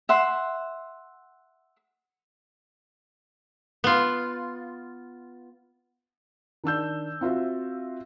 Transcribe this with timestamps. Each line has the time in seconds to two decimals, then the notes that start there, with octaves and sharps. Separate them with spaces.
0.09 E5 F#5 C6
3.84 B3 F4
6.64 D#3 D4 E6 G6
7.21 C4 F4 F#4 E5